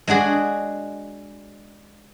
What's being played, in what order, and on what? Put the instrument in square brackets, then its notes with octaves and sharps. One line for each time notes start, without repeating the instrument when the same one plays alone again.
[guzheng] G#3 D4 F#4 G#4